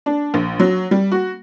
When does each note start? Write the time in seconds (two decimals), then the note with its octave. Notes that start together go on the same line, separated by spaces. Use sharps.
0.06 D4
0.34 A#1
0.60 F#3
0.91 G3
1.12 F#4